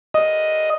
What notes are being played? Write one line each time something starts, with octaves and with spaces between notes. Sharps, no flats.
D#5